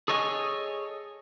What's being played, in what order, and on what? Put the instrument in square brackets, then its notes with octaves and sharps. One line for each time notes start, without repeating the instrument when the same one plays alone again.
[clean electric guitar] G#4 A4 C#5 D#5 F5 G#5